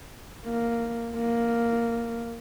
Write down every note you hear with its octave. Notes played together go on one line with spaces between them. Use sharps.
A#3
A#3